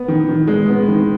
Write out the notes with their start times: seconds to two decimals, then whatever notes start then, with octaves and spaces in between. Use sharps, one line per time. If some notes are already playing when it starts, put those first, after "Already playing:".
Already playing: B3
0.08 D#3
0.29 D#3
0.47 G#3
0.68 B3
0.88 D#3